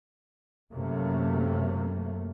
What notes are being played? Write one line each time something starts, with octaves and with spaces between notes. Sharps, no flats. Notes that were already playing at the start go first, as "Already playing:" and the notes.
F#1 F#2 C3 F#3 A3 A#3